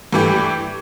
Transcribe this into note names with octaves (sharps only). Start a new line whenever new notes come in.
G2 E3 A3 E4 G4